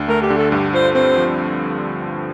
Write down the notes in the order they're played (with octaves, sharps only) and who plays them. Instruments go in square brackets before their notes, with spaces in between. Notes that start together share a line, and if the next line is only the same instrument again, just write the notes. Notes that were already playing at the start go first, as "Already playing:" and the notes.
Already playing: [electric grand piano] D2 D4
[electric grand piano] A3 [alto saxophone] A#4
[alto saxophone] G4
[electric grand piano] D3
[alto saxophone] A4
[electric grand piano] G2 [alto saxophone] G4
[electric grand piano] F4 [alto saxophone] C5
[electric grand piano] C4 [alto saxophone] C5
[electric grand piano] F3